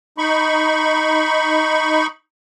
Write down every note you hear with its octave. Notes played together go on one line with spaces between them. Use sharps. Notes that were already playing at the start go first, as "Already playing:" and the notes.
D#4 B5 C#6